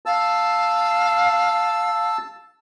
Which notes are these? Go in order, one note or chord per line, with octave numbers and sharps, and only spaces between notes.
F5 A5 E6